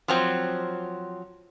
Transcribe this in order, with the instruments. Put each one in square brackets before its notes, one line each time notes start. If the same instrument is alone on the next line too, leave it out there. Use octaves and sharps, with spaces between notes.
[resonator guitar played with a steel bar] F3 F#3 C4